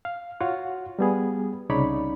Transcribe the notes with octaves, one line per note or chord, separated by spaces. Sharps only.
F5
F4 F#4 C#5 F5 F#5
G3 B3 G#4
C2 C#3 D#4 C#5 D5 B5